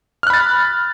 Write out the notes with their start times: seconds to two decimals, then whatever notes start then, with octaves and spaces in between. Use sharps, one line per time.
0.23 F6
0.27 F#6
0.30 B5
0.34 A6